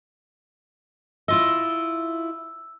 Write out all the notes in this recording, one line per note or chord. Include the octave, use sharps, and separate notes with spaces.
E4 F4 D#5 E6